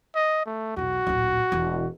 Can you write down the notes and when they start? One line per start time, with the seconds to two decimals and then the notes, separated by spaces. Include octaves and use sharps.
0.15 D#5
0.46 A3
0.77 B1 E2 F#4
1.07 D1 A#1
1.52 E1 E3